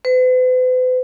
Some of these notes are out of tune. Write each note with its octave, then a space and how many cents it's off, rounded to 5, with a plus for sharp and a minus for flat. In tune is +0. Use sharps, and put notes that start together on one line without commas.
B4 +45